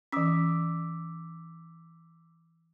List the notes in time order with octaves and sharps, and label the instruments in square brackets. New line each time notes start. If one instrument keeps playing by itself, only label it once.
[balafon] E3 C#4 [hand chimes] D6 E6 B6